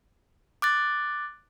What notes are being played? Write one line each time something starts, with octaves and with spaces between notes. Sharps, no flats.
D6 F#6 A6